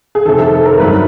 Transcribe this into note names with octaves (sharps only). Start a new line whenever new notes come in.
G#4
F2 C3 D#3 A4
A4
A4
A#4
G2 D#3 F#3 B4